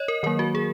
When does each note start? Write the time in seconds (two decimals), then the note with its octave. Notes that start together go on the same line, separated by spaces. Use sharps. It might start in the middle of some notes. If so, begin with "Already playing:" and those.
Already playing: C#5 D#5
0.08 A#4
0.23 D#3 F#3 A#3 A#4
0.39 F#4
0.55 G#4